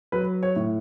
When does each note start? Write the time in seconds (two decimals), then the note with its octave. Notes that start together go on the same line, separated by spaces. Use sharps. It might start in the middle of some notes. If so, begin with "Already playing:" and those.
0.12 F#3 B4
0.43 C#5
0.56 A2